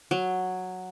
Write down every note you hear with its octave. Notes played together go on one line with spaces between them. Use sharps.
F#3